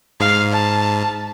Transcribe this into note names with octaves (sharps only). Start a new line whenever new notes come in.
G#2 F5
A5